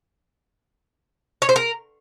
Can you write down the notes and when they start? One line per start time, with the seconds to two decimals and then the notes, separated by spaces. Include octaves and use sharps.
1.42 C#5
1.49 C5
1.56 A#4